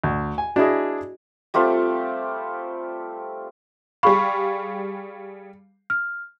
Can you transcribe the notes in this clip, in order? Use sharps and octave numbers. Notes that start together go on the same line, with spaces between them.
D2
G#5
D4 E4 F#4 G#4 D#5
G3 A3 C4 F4
G3 G#4 F5 B5 C#6
F6